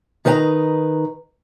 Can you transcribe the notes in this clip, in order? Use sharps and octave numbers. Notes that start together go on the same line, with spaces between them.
D#3 D#4 B4 G#5 A#5